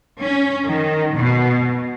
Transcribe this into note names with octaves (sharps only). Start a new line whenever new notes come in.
C#4
D#3
B2